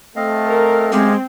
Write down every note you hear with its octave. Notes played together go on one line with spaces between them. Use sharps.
A3 C4 D#5 F5
A#4
F#2 G#3 C4 G4 F5